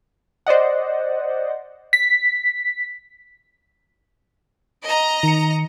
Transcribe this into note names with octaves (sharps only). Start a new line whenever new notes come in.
C5 D5 D#5 F#5
B6
D#5 A#5
D#3 C#7